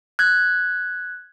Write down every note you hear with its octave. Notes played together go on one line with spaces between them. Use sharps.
F#6 G#6